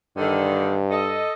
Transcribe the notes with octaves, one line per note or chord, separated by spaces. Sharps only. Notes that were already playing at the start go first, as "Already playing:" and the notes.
G2 D3 D#3
A4 D#5